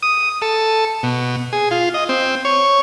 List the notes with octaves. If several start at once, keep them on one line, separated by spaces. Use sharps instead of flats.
D#6
A4
B2
G#4
F4
D#5
C4
C#5